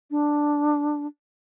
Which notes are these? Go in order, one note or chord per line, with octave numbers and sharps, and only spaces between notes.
D4